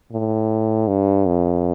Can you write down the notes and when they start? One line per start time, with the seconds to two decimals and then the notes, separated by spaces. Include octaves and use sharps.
0.12 A2
0.88 G2
1.26 F2